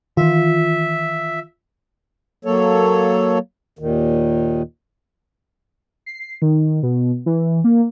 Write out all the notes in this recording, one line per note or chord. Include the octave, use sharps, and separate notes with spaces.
D#3 E3 F4 E5
F#3 A#3 A4 C#5
D#2 A#2 D#3
C7
D#3
B2
E3
A#3